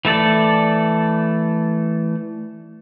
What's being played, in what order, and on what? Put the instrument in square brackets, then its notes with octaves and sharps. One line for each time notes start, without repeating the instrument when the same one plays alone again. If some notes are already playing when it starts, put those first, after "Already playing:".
[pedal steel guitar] E3 A3 A4 D5